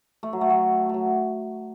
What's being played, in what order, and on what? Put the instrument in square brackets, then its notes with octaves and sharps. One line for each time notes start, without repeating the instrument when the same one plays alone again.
[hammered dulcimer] A3
F#3
A3
F#3
F#3 A3